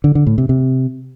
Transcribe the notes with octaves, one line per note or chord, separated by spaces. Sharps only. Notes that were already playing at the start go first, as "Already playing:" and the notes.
D3
D3
A2
C3
C3